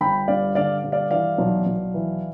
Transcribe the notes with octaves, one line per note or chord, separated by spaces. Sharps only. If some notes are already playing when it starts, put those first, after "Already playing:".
G1 G5 B5
G2 D5 F5
D3 D5 F5
G2
D5 F5
E3 D5 F5
B1
B1
E3